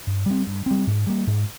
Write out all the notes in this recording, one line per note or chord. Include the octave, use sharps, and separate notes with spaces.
G2
G3 C4
G2
G3 C4
G#2
G3 A#3
G#2